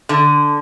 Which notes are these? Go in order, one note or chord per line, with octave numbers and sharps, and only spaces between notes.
D3